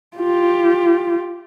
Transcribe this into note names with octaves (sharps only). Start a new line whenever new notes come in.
F4 G4